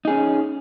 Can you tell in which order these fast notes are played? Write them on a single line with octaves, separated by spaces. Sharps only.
D#4 G#4 C#4